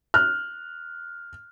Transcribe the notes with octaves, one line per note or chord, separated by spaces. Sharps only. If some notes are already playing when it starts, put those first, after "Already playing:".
F6 F#6